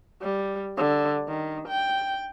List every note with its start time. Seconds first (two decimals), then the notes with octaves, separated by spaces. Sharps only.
0.22 G3
0.77 D3
1.28 D#3
1.68 G5